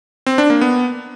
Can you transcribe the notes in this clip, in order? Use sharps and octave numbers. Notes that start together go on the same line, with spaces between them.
C4
D4
A#3
B3